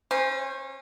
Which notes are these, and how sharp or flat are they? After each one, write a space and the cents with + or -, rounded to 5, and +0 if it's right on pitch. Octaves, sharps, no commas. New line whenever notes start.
C#4 -30 C5 +0